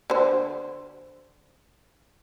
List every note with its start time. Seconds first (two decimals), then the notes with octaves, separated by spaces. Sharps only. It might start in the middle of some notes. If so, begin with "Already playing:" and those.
0.10 D3 C5